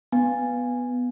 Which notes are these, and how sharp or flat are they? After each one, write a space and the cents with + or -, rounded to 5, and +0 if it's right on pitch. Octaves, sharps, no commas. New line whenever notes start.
B3 +0 G#5 -10